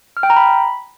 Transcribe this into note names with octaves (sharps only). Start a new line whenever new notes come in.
F6
G5
A#5
B5